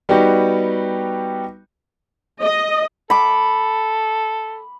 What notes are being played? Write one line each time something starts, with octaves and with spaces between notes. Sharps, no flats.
G3 B3 D#4 F#4 G4
D#5
A4 B5 D6